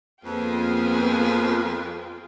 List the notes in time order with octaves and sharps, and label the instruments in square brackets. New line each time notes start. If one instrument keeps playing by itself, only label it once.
[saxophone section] F2 [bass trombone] A#3 [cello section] B3 B4 [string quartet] F4 G#4 G5